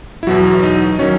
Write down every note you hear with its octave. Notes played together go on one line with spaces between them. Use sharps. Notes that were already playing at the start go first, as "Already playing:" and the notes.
E4
E2 B2 F#3 F#4
D#4 D#5
D#3 F#3 C#4 C#5